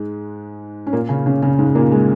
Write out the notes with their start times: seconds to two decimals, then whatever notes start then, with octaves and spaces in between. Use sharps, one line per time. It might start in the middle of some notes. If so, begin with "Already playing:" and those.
Already playing: G#2 G#3
0.87 C#4
0.93 A#2 A#3
1.09 C#3 C#4
1.26 C#3 C#4
1.42 C#3 C#4
1.58 G#2 G#3
1.75 A#2 A#3
1.91 G#3